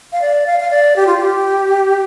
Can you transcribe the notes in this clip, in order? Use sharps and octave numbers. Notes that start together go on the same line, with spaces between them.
F5
D5
F5
F5
D5
G4
F4
G4